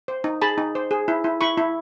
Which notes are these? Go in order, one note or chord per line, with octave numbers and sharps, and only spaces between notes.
C5
D#4
G#4 A5 B5
D#4
C5
G#4
E4
E4
E4 B5 C#6
E4